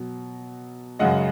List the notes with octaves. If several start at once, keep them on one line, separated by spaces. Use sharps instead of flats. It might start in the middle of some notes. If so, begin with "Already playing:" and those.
Already playing: B2 F#3
F#2 C#3 G#3 D#5 F#5